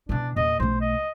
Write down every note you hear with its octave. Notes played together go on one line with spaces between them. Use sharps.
B2 E3 D4
E2 A#2 D#5
B1 A3 C5
D#5